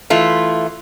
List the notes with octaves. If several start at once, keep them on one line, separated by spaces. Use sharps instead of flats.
E3 A3 F4